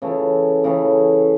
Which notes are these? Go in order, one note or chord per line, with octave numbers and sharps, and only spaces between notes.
C#3 E3 A3
C#3 E3 A3